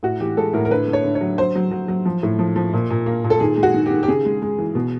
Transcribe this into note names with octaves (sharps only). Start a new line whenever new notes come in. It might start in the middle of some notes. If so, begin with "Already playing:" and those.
A2 F#4
E3 G4
G#3 A4
A2 A#4
A#4
D3 B4
D3
C#5
D3
C#5
F#3
F#3 C5
F#3
F#3
F#3
F3
A2
F3
F3
A#2
A#2
A#3
A#2
A4
D#3 G#4
G#3
F#4
D#3
G4
D#3
G4
C#3 G#4
G#3
G#3
E3
B2